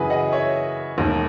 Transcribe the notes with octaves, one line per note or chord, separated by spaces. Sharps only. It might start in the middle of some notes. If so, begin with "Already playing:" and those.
Already playing: F#2 C#3 E3 F#4 G#4 B4
D#5 F#5
C#5 E5
E1 D#2 D#3